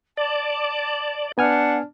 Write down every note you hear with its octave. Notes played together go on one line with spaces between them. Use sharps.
D5 A5
B3 D4 F#5 G#5 F6